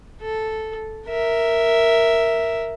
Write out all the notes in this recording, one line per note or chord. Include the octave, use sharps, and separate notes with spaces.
A4
A#4 E5